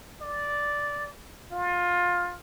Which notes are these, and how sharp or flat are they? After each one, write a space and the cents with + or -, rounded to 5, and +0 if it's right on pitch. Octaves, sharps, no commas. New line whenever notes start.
D5 -5
F4 +20